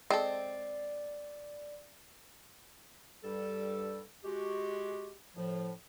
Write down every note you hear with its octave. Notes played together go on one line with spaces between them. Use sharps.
G#3 C4 A4 D5
G2 G3 A4
G#3 F#4 G4
A2 F3